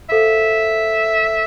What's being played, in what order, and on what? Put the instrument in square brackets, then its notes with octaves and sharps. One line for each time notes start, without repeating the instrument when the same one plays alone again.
[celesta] A4 C5 F5 [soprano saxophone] E5